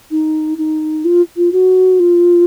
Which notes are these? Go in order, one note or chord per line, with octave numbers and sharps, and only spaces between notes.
D#4
D#4
F4
F4
F#4
F4